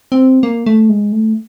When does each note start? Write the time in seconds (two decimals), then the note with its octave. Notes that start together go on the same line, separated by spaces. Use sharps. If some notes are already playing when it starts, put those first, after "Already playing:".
0.12 C4
0.43 A#3
0.66 A3
0.89 G#3
1.12 A3